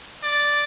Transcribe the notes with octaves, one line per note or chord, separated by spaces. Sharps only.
D5